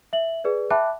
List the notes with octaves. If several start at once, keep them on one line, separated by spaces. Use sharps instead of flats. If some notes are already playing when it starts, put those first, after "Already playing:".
E5 F#7
G#4 B4 D5
E5 G5 A5 B5 D6 F#6